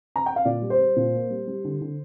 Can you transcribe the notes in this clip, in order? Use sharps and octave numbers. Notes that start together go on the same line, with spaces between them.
A#5
G5
F5
A#2 D5
G3
C5
G3
A#2
A#3
G3
G3
D3
D3